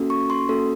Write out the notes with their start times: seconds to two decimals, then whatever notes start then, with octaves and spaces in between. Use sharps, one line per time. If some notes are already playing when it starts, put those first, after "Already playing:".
Already playing: A#3 C#4 F#4 A4
0.10 C#6
0.30 C6
0.49 A#3 C#4 F#4 A4